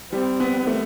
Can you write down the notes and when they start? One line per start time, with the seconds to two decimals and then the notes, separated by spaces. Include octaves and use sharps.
0.11 G3 C4
0.40 B3
0.67 A3